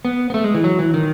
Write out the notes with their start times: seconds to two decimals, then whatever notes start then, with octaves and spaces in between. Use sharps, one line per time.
0.05 B3
0.30 B3
0.34 A3
0.44 G#3
0.54 E3
0.64 F#3
0.79 E3
0.94 D#3